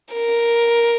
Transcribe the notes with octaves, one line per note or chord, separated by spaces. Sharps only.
A#4